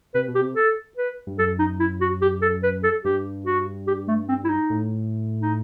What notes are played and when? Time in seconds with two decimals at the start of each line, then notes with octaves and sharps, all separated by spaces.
0.14 C3 B4
0.28 B2
0.35 G4
0.41 C3
0.56 A4
0.97 B4
1.27 G2
1.38 F#2 A4
1.59 D#4
1.80 E4
2.01 F#4
2.22 G4
2.42 A4
2.63 B4
2.83 A4
3.04 G2 G4
3.46 F#4
3.87 G4
4.08 A3
4.28 C4
4.45 E4
4.49 D#4
4.70 A2
5.42 D#4